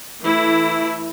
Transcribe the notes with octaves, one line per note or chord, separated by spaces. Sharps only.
E3 A3 E4